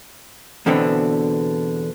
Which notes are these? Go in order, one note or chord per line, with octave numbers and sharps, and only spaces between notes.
E2 B2 D3 B3 C4 D4